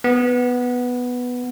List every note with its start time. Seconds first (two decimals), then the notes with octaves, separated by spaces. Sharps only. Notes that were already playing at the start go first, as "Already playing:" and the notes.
0.04 B3